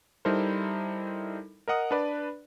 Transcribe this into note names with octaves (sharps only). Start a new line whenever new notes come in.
G3 D#4 E4 A4 A#4 C5
A#4 D#5 F#5 D#6
D4 B4 D5